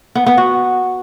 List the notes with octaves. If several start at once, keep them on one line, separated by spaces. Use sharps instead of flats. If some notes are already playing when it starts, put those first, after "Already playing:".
B3
B3
F#4